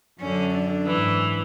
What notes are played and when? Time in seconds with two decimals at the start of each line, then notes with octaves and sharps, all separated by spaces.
0.20 F#2 D3 C#4
0.54 D4
0.86 G#2 E3